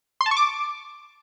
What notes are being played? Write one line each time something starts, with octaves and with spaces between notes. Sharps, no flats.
C6
A5
C#6
D6